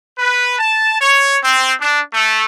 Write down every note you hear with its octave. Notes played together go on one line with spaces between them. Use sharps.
B4
A5
C#5
C4
D4
A3